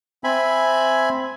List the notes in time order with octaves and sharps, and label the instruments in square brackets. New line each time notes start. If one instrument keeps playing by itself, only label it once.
[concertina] C4 E5 G#5 B5